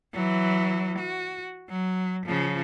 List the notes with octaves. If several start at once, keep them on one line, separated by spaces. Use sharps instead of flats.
E3 F#3
F#4
F#3
C#3 F3